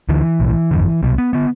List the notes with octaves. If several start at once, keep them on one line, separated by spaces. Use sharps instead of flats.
D2 D3 E3
B1 A2
G1 F2 D3
C2 B2
B3
D3 B3